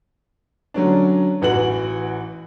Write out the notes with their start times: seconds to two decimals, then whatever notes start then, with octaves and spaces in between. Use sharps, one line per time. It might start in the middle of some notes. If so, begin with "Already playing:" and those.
0.74 D3 F#3 C#4 D4
1.41 A1 E3 F#4 F#7